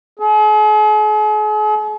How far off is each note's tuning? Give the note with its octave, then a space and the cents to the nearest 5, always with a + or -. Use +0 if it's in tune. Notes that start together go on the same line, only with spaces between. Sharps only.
G#4 +45